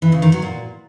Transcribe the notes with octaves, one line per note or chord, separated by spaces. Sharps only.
E3
C#3
D#3
F#3
A#2